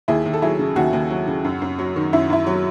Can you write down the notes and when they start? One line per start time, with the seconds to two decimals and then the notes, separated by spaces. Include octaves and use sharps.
0.08 D#2 E4 G#4
0.26 D#2
0.33 A4
0.42 F#3 E4 G#4
0.59 C#3
0.76 D#2 F#4
0.93 D#2
1.10 F#3
1.27 C#3
1.44 F#2
1.62 F#2
1.79 F#3
1.96 D#3
2.13 F#2 E4
2.30 F#2 E4
2.47 F#3